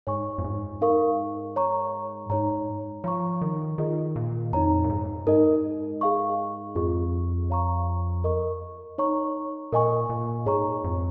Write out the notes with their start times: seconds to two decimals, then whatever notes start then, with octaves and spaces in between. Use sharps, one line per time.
0.07 G#2 C#5 G#5 C#6
0.38 F2
0.44 G#2
0.81 D#4 A#4 F5 C#6
1.56 C#5 A#5 C#6
2.30 G#2 D#4 C#5 A#5
3.04 F3 C#5 A#5 C#6
3.41 D#3
3.78 D#3 F4 G#4 D#5
4.16 A#2
4.53 F2 D#4 C#5 A#5
4.84 A#2
4.90 G#2
5.27 G#2 D#4 A#4 D#5
6.01 G#4 F5 C#6
6.75 F2 F4 G#4 D#5 C#6
7.50 C#5 F5 A#5 C#6
8.24 A#4 D#5 C#6
8.98 D#4 C#5 A#5 C#6
9.72 A#2 A#4 D#5 G#5 C#6
10.09 A#2
10.46 G#2 G#4 C#5 A#5 C#6
10.84 F2